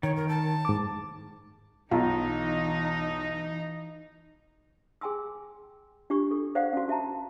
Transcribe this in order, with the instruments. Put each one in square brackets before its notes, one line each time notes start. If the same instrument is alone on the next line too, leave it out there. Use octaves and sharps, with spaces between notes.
[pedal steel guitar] D#3 [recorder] C#5
[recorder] A#4
A5
[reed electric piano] G#2 D6
[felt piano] B1 F4 A#5 [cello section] E3 D#4
[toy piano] G#4 G5 G#5 C6 E6
D4 F4 G4 C#6
A4
C5 D5 F5 F#5
C#4 F#4
C#4 F#4 E5 G5 A5 A#5